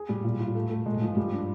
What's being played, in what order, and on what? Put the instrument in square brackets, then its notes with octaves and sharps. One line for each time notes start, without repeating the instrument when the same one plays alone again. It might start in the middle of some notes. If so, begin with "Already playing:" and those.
Already playing: [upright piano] G#4
[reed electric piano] A2 [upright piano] G3
[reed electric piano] A#2 [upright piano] F4
[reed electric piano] A2 [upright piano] F4
[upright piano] A3
A3
[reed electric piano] A#2 [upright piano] G#3
[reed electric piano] A2
[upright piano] F3
[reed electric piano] G#2
[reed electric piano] G2 [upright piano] G3
[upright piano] D4